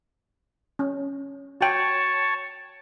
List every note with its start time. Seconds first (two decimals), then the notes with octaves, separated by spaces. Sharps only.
0.79 C#4
1.61 F#4 C#5 G5 A5